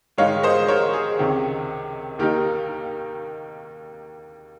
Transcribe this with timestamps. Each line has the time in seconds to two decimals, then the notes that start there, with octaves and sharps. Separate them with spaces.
0.18 G#2 D#3 G#3 D#4 C#5 F5
0.43 C5 D#5
0.68 A#4 C#5
0.93 G#4
1.19 C#2 C3 D#3
2.19 D#2 D#3 A#3 D#4 G4 A#4